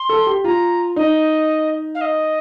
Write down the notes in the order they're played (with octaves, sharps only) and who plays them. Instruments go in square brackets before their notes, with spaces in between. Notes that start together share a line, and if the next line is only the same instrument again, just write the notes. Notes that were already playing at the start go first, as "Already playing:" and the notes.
Already playing: [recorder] C6
[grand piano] A4
G4
[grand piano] F4 [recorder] A#5
[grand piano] D#4 [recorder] D#5
[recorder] F5
D#5